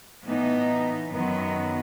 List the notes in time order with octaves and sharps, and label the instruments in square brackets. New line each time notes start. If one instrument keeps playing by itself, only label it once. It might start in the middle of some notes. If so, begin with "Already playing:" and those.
[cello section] A2 E3 B3 D#4
F#2 D#3 F#3 B3